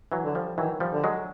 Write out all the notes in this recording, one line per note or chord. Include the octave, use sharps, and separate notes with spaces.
E3 F#3
D3
F3 G3
D#3 E3 F#3
F3 G3
D3
F#3 G#3